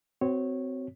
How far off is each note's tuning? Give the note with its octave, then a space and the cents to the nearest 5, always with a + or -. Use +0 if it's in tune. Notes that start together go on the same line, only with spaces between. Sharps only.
C4 -20 F#4 +25 C#5 -10